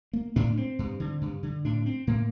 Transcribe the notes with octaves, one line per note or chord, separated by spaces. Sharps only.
A#3
A2 D4
C4
G2
D3
G2
D3
A2 D4
C4
A2 A#3